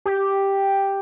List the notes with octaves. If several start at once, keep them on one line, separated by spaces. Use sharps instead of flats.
G4